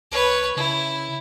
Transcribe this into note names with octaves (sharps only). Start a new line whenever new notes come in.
C2 B4 C#5
C#3 E4